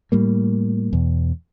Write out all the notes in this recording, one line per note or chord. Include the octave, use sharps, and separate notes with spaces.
A2 G3 A#3
E2 B2